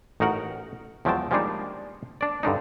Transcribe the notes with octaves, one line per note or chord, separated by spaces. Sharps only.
A1 D#4 F#4 A#4 F#5
E2 F3 F#3 G#3 G5 A5
F3 G3 G#3 A#3 D4 D#4
D4 D5
G2 D3 D4 D#4